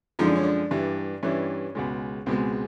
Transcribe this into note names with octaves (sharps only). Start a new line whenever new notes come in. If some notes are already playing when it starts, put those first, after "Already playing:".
F#2 D3 F3 G#3 D#4
D4
C#4
D4
G2 E3 G3
G2 E3 G3 C#4
C#2 B2 G#3
C#2 B2 G#3 C4